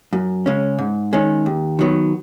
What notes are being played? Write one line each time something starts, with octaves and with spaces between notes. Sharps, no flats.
F#2
C#3 G#3 C#4
G#2
D#3 G#3 C#4
D#2
D#3 F#3 B3